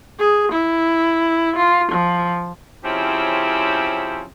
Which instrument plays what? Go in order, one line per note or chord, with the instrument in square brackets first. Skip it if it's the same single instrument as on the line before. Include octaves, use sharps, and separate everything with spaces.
[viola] G#4
E4
F4
F3
[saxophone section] C#3 F3 C4 C#4 E4 G4